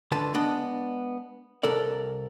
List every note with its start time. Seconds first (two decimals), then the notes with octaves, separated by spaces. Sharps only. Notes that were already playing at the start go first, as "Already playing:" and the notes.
0.12 C#2 D3 B4 A5 C6
0.34 G#3 B3 D4 D#5
1.63 C2 C3 A4 A#4 D5